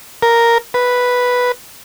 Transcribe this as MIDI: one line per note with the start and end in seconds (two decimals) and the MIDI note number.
0.23 0.58 70
0.74 1.52 71